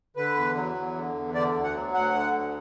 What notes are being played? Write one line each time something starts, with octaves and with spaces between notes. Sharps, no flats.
D3 B4
E2
F#3
E2
D3
E2
D3 D5
D2
F#5
F#3
D2 F#5
D3
D2